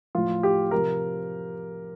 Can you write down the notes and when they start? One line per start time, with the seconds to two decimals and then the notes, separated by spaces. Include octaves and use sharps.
0.15 A2 F3 F4
0.43 G4
0.71 C3 F3 A#4